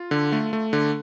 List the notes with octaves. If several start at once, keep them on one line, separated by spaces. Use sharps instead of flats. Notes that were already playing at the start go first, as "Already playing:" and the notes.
Already playing: F4
D3
A3
A3
D3